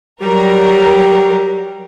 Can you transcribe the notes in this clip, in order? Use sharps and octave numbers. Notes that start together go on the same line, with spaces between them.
F#3 G3 A#4